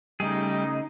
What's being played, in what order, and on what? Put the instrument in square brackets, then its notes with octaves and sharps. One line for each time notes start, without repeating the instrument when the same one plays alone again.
[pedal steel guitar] C#3 A3 G#4 [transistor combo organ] G3 [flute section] D#4